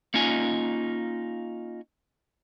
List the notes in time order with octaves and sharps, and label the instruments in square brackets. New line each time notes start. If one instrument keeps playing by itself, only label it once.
[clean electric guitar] A#3 C#4 D#4 F4 G#5